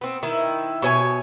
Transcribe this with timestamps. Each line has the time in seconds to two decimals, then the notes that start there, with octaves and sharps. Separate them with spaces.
0.01 B3 C4
0.23 D#3 E4
0.82 B2 C#5 G#5